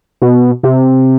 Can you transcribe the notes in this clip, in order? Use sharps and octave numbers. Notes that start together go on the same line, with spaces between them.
B2
C3